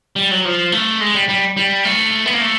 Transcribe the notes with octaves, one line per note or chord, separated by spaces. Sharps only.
G3
F#3
F3
A3
G#3
G3
G3
G3
A3
B3
A#3
A3